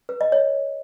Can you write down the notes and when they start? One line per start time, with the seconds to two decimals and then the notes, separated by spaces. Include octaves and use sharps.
0.09 B4
0.21 D#5
0.32 C#5